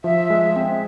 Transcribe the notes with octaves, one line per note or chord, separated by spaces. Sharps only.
F3 E5
G#3
C4